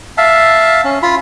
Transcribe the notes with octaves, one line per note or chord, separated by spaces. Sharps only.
E5 F5 A5
C#4
F4 B5